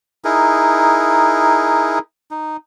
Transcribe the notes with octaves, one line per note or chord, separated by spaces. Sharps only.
D#4 E4 G#4 A#4
D#4